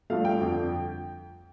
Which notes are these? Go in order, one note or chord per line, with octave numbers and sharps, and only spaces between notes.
G2 F3 A3 F5
G5
F2 D3 F3